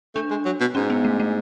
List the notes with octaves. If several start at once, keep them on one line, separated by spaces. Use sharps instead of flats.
A3 D4
G#3
F#3
B2
G#2 C#4
B3
A3
A3